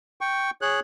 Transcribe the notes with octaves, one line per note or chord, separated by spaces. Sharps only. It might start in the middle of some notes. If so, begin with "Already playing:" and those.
G5 C#6
G#4 C#5 F#6